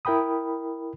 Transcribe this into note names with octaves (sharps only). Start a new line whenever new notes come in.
E4 A#4 G5 B5 D#6